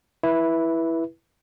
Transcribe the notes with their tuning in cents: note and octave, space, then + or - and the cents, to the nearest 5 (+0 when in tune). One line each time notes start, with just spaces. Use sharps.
E4 +0 B4 -20